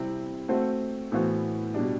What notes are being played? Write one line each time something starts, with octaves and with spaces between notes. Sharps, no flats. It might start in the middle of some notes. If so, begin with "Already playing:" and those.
Already playing: C3 G3 C4 E4
A3 C4 F#4 A4 C5
A2 E3 B3 F#4 C5
B2 G3 D4